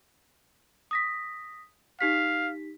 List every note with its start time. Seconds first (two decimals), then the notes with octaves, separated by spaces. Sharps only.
0.91 D#6 A#6 B6
2.01 D#4 G4 F5 B6